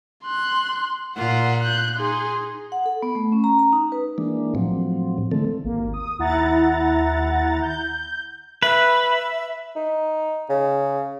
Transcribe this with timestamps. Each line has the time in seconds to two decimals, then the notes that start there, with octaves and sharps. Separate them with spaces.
0.24 C6 F#6
1.16 A#2 F4 F#5
1.63 F#6 G6
1.96 D#4 G#4 C6
2.72 F#5
2.86 A4
3.02 B3
3.15 A3
3.32 C#4
3.44 A#5
3.59 A#5
3.73 D#4
3.92 B4
4.18 E3 G#3 A#3 D4
4.55 A2 F3 F#3 C4
5.31 D3 E3 G#3 A3 C4 A4
5.64 G#1 D#2 A#3
5.93 D#6
6.19 D#2 E4 F#5 A#5 A6
7.62 G6
8.63 B4 E5
9.76 D#4
10.50 C#3